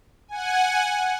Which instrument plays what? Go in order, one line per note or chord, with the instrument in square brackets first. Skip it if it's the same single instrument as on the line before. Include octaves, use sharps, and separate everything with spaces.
[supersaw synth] F#5 G#5